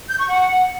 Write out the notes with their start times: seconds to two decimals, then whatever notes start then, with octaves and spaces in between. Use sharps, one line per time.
0.07 G6
0.18 C#6
0.29 F#5